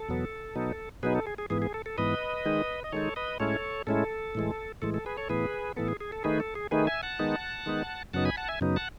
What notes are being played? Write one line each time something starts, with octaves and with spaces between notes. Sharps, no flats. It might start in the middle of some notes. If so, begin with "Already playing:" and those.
Already playing: A4
E2 B2 F#3 B3
B2 F#3 B3 D#4
B2 F#3 B3 D#4 G#4 B4
A4
G#4
G#4
G#2 E3 B3 G#4
G#4
A4
A4
G#2 E3 B3 B4 D#5
D#3 G#3 D#4
D#5
D#3 G#3 D#4 A4 C#5
B4 D#5
A2 G#3 C#4 E4 A4 C#5
A2 G#3 C#4 E4 A4
A2 E3 G#3
A2 E3 G#3 A4
A4
G#4 B4
A4 C#5
A2 E3 B3 G#4 B4
A2 E3 B3 A4
G#4
G#4
A4
D#3 A3 D#4 G#4 B4
A4
G#4
D#3 A3 D#4 G#4 B4
E5 G#5
F#5 A5
D#3 G#3 B3 D#4
D#3 G#3 B3 D#4
F#2 C#3 F#3 B3 D#4 F#5 A5
G#5 B5
F#5 A5
E5 G#5
F#2 C#3 F#3 B3 D#4
F#5 A5